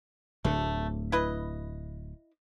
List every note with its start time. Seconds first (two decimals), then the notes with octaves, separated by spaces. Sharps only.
0.45 D1 D2 D3 A3
1.12 E4 B4 D#5